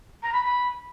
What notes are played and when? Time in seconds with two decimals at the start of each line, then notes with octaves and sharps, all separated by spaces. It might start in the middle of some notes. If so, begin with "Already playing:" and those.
0.22 A#5
0.32 B5
0.43 B5